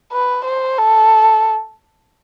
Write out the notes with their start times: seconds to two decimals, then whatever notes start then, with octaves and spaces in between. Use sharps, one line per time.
0.12 B4
0.45 C5
0.78 A4